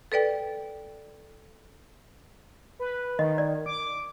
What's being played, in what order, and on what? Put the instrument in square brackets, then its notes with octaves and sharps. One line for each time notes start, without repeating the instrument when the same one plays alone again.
[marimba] A4 B4 D5 G5
[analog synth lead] B4
[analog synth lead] D#3 [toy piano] D#5
[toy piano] D5
[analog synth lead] D6